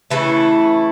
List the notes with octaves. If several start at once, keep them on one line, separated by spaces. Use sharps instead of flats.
C#3 E3 A3 E4